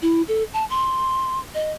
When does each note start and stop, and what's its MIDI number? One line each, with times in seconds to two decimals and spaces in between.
0.02 0.22 64
0.28 0.44 69
0.53 0.65 81
0.70 1.39 84
1.54 1.72 75